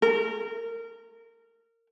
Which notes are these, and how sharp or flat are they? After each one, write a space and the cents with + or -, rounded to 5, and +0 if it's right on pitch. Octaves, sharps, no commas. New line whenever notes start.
A#4 -20